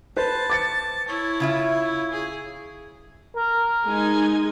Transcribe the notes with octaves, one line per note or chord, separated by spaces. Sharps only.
B4 C5 A5
D6 A6 C#7
E4 C#5
C#3 F4 E5
G#4
A#4
G#3 D#4 G#5